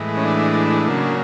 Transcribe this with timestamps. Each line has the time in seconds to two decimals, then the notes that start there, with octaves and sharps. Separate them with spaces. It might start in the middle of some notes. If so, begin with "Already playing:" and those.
Already playing: A2 E3 G#3
0.17 C#4
0.25 D4
0.88 C#3 F#3 A#3